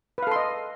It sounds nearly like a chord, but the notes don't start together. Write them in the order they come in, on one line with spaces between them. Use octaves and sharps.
B4 F5 A4 C6 D#5